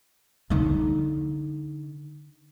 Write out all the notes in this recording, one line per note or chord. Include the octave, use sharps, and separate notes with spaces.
D3 D#4